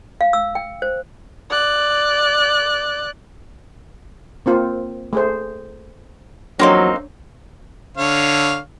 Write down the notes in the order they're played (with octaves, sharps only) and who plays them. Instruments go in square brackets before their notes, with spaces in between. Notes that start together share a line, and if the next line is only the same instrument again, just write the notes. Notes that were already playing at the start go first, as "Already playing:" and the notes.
[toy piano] F5
E6
G5
C5
[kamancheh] D5 F#6
[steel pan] A#3 C4 F4
A3 G#4 C5
[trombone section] E2 F3 F#3 [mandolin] A#3 C4 D#4 [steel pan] D4 C#5
[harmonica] D3 C#5 F5